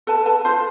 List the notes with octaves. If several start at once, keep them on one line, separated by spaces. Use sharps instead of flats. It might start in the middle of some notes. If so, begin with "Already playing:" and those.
A4 B4 A5
A4 B4 A5
F4 C5